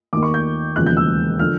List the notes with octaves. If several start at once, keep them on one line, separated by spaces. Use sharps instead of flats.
D#2 D#3 D6
C#6
G6
E1 D#2 C#3 F3 F#6
G6
E6
D3 F3 F6